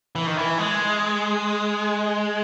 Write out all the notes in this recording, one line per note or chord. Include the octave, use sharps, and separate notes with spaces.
E3
D#3
E3
G#3